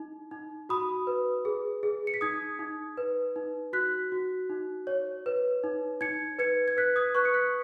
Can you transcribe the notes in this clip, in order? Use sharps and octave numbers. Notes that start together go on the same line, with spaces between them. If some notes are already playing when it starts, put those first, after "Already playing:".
Already playing: D#4
D#4
F#4 B5 D#6
B4
G#4
G#4
C#7
B6
D#4 D#6 G#6
D#4
B4
D#4
F#4 F#6 B6
F#4
D#4
C#5
B4
D#4
D#4 G#6 C#7
B4 G#6 C#7
G#6
B4 F#6 B6
D#6 G#6
B4 C#6 F#6
C#7
F#6 B6